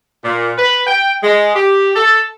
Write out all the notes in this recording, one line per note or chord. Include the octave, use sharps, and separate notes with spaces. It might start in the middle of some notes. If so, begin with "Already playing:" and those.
A#2
B4
G5
G#3
G4
A4